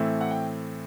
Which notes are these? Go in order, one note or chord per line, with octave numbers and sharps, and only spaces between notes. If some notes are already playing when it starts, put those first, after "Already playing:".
Already playing: A2 E3 A3 C4
F#5
G5